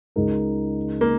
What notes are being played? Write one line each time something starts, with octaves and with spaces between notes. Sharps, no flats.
C#2 C#3 G#3 D#4 A#4
A#3